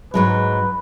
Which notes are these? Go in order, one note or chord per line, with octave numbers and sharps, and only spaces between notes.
G#2 F#3 G#3 B4